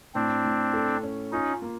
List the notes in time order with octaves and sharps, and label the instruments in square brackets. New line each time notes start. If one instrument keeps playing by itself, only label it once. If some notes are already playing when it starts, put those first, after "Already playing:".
[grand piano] A2 [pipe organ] C4 D4
[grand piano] A2
A4
C#4
[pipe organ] C#4 D#4 [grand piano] F4
[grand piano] A#3